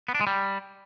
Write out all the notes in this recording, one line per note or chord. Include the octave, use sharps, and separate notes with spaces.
B3
D4
G#3
G3